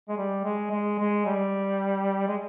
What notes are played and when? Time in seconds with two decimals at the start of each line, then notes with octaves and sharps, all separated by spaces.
0.09 G#3
0.17 G3
0.44 G#3
0.71 G#3
0.99 G#3
1.26 G3
2.28 G#3